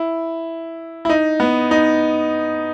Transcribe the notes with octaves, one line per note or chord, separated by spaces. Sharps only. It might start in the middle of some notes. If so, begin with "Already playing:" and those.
Already playing: E4
E4
D#4
B3
D#4